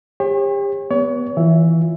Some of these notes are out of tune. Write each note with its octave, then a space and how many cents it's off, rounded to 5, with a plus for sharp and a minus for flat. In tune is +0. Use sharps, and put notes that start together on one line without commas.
G4 +35 C#5 -40
B3 -5 C#5 +35
E3 +0 F4 +0 E5 +0